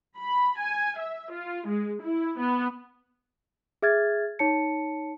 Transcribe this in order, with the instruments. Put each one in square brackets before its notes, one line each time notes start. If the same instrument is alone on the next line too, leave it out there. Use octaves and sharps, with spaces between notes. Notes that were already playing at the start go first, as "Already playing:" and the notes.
[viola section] B5
G#5
E5
F4
G#3
E4
B3
[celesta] G#4 E5 F6 G#6 A6
D#4 C#5 A5 C#7